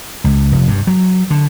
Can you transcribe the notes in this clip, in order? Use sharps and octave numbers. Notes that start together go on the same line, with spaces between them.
C#2
F1
G2
F#3
D3